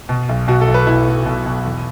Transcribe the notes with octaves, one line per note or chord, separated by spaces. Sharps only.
B2
B1
B2 F#4
A4
B1
B4
B2 E4
B2
B2
B2
E2